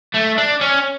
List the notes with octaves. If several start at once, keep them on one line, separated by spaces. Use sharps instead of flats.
A3
D4
C#4